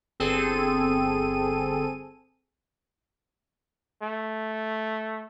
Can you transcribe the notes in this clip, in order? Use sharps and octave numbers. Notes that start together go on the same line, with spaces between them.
G1 C4 G#4 A4 D#7
A3